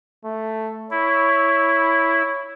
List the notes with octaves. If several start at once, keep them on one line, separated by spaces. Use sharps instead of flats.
A3
E4 C#5